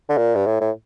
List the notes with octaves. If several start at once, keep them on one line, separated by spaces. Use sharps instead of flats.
D3
A#2
G2
A2
A2